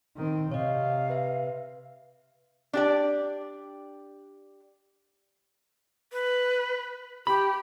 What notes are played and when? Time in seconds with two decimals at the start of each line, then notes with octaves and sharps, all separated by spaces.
0.16 D#3 C4
0.52 C3 C#5 D#5 F5
1.10 B4 E5
2.73 D4 G4 D5
6.12 B4
7.27 G4 B5